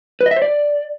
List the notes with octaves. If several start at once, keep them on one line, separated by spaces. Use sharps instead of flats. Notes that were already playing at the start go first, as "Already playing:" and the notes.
B4
D#5
E5
C5
D5